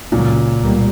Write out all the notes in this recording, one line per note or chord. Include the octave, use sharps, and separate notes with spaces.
C#2 A#2 C#3 F#3
C#2 B2 G3 A#3